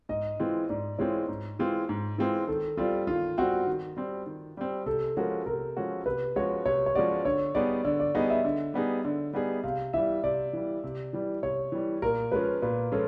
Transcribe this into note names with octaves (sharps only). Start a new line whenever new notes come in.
G#2 D#5
E3 G#3 C4 F4
G#2 D5
E3 G#3 C4 F4 C#5
G#2
E3 G#3 C4 F4
G#2
E3 G#3 C4 F4
D#3 A4
G3 C4 F4
D#3 F4
G3 C4 F#4
D#3
G3 C4
D#3
G3 C4
C3 A4
F3 G#3 C#4 F#4 A#4
C3 A#4
F3 G#3 C#4 F#4
C3 B4
F3 G#3 C#4 F#4 C#5
C3 C#5
C#5
F3 G#3 C#4 F#4 D5
D3 C#5
G3 B3 D#4 G#4 D5
D3 D5
D5
G3 B3 D#4 G#4 D#5
E5
D3
G3 B3 D#4 G#4
D3
G3 B3 D#4 G#4
C3 F5
E3 G3 E5
C3 D5
E3 G3
C3
E3 G3
C3 C#5
E3 G3
A#2 A#4
F3 G#3 C#4 F4 B4
A#2 B4
F3 G#3 C#4 F4 A4